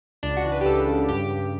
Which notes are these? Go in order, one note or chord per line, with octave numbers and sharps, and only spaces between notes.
C#2 D4
F#4
E3
B4
G4
C#2 A4
C#3
G2 G4
G2